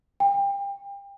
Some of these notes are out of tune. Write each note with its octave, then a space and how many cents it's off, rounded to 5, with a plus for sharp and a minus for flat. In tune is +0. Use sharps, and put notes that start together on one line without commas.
G5 +30